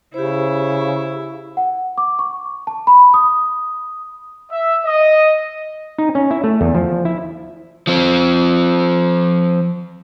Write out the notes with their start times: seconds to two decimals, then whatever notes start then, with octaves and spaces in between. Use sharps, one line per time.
0.14 C#3 E4 G4 C5
1.57 F#5
1.98 D6
2.19 C#6
2.67 A5
2.87 B5
3.14 D#6
4.51 E5
4.84 D#5
5.98 D#4
6.15 C#4
6.31 E4
6.44 A3
6.61 E2
6.75 F3
7.05 E4
7.87 F3 C4